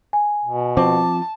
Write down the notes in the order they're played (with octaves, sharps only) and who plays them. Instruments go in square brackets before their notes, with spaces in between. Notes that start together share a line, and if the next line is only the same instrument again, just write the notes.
[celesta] G#5
[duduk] B2
[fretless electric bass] F3 C4 [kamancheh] A5 [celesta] D6